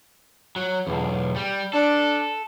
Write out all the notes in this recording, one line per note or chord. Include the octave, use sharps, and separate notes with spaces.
F#3
B1 E2
G3
D4 A4